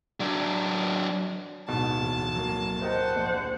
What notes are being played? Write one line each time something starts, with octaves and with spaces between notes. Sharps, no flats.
F#3 D4
D1 G#2 B2 A5
E2
F#3 A#3
G4 A#4 C5 D#5 F#5
A#1 F2